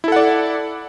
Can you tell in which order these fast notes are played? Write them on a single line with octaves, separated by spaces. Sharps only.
E4 A4 F#5 D5